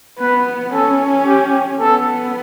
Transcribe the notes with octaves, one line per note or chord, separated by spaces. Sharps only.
B3 B4
C#4 A4
G4
B3 A4